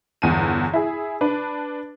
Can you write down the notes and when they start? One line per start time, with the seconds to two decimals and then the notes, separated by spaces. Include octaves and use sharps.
0.22 G1 E2 G#5 D#7
0.73 E4 G#4
1.21 D4 B4